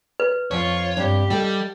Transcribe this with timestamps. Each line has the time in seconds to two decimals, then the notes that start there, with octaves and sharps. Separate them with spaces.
0.20 B4
0.51 F2 F4 C#5
0.97 G2 C3 G4
1.30 G3 A4 D#5 G5